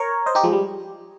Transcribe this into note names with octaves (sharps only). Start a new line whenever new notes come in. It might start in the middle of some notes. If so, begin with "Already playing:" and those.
Already playing: A#4 C#5
C5 D#5
D#4 G4
F3 G#3
G3